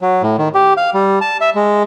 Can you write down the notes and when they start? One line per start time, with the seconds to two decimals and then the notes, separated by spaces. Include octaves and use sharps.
0.01 F#3
0.23 A2
0.38 D#3
0.55 G4
0.77 F5
0.94 G3
1.21 A5
1.41 E5
1.55 G#3